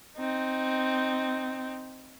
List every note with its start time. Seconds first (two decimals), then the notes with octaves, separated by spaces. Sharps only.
0.17 C4 D#4